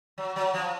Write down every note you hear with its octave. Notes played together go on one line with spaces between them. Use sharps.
F#3
F#3
F3